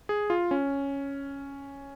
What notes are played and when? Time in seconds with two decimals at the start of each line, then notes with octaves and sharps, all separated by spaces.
0.09 G#4
0.30 F4
0.51 C#4